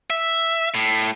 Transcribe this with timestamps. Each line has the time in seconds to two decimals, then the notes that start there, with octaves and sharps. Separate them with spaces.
0.10 E5
0.75 A2